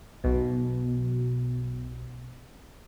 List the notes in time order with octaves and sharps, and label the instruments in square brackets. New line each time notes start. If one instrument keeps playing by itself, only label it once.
[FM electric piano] B1 B2